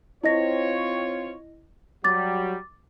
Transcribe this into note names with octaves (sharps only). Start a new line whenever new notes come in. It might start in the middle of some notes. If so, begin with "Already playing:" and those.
C4 E4 F4 C#5 D#5 A#6
F#3 G3 D6 A6